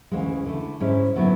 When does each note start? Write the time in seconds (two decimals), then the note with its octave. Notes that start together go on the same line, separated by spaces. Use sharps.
0.11 D2 C#3 E3 G#3
0.46 D3 A3 E4
0.80 G#2 G#3 C#4 E4
1.15 D3 F#3 B3 E4